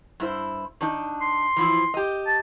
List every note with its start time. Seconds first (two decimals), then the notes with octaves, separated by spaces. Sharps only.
0.20 G2 E4 C5
0.81 D#3 D4 D#4
1.21 C6
1.56 E3 F3 E4
1.94 G4 D#5
2.27 A5